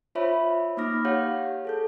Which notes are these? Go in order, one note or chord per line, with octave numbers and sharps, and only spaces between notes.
F4 C5 C#5 E5 B5
A#3 D#4 B5 D6 F6 A#6
G4 C#5 F5 F#5 G6
G#4 A4 G6